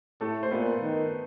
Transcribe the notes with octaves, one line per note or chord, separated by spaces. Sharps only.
A2 A3 A4
C5
A#2 B3 B4
D#3